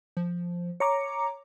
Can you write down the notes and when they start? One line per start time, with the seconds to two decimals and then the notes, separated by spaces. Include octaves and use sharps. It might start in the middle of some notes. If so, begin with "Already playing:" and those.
0.17 F3
0.80 C#5 A#5 D6 C#7